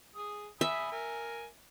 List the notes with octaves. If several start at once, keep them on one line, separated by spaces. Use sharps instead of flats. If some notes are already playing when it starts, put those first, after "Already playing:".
G#4 D#6
E5 G#5 B5 D#6
A#4 G#5